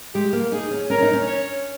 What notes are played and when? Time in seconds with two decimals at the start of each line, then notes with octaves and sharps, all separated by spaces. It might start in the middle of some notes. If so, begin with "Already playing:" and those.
0.15 G#3 G4
0.33 A#3
0.52 D#4 G#4
0.71 C#4
0.90 C#4 A#4
1.02 D#4
1.13 C#4
1.27 C#5